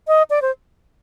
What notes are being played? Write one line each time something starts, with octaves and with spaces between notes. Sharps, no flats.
D#5
D5
C5